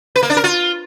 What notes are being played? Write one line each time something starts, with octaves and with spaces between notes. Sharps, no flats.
B4
A#3
D4
A#4
F4